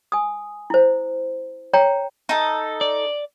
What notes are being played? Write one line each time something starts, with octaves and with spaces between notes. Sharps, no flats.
G#5 D#6
E4 C5
C#5 G5 A#5
D#4 A4
D5